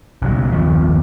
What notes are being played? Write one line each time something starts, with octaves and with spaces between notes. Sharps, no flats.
B1 C#3 F#3
F#1 D#2 F3